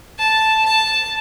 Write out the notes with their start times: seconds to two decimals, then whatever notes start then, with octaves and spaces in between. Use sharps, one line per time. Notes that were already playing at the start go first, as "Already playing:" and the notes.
0.19 A5
0.66 A5